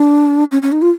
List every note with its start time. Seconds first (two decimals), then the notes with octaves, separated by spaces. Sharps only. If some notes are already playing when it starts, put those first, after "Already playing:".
Already playing: D4
0.52 C#4
0.62 C#4
0.72 D#4
0.82 F4